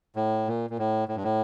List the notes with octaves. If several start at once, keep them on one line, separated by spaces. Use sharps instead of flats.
A2
A#2
A#2
A2
A2
G2
A2